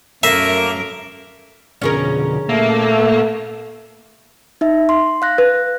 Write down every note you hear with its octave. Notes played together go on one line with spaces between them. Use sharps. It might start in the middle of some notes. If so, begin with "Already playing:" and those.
F#2 A3 A#3 A#4 E5
F2 B2 D3 C#4 G#4 A#4
A#2 A3 A#3 A4 E5
D#4 E5
C6
F5 F#6 A#6
B4